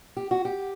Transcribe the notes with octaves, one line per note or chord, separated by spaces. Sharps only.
G4
F#4
G4